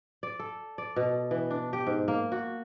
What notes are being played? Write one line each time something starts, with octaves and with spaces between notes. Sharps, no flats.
D5
A4
D5
B2
E3
D4
G4
G#2
A#3
F#4